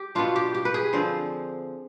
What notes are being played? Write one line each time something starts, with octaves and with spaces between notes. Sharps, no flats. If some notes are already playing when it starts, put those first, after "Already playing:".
Already playing: G4
B2 B3 D4 F4
G4
G4
B4
G#4
D3 F3 C4 C5